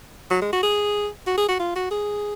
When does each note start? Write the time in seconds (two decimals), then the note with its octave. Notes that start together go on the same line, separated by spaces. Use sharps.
0.30 F#3
0.42 G#3
0.53 F#4
0.63 G#4
1.27 F#4
1.38 G#4
1.49 F#4
1.60 F4
1.75 F#4
1.91 G#4